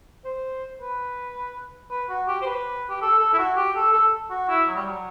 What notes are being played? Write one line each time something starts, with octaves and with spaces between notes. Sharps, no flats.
C5
B4
B4
F#4
G4
C5
B4
G4
A4
A4
E4
F#4
G4
A4
A4
F#4
E4
F#3
G3
F#3